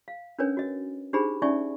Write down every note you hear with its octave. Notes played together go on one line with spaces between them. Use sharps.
F5
C#4 D4 A#4 B4 C#5 G#5
F#4 D#5
D4 D#4 G4 G#4 C5 B5
C#4 D#4 D5 E5 G#5 C#6